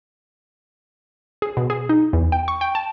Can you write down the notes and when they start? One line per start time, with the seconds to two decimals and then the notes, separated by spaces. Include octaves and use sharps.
1.42 G#4
1.57 B2
1.70 G#4
1.89 D#4
2.13 E2
2.32 G5
2.48 C#6
2.61 G5
2.75 A5